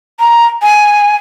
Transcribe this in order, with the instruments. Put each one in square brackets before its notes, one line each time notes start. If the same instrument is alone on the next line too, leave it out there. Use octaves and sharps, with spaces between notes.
[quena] A#5
G#5